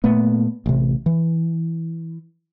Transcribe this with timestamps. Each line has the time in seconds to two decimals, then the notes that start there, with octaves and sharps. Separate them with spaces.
0.04 A#2 A3 B3
0.66 A1 C3
1.06 E3